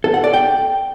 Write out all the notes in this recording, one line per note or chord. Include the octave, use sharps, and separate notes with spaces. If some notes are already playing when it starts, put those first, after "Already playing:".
A4
F#5
D5
G5